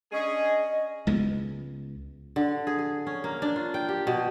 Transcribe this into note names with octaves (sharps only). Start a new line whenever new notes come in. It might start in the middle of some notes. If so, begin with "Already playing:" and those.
C#4 D4 G#4 D#5
C#2 G#3 B3
D3
G#4
G#4
C#4
A#3
D4
F4
G5
G4
B2